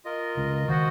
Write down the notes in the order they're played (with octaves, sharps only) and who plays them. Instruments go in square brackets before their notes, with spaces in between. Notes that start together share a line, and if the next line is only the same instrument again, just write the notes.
[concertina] F4 A#4 D#5
[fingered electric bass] C#2 C#3
[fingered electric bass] D#3 [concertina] F#4 C5 D#5 F#5